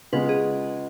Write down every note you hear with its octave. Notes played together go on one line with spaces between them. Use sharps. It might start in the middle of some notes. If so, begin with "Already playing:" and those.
C#3 G#3 B3 F4 B4
G#4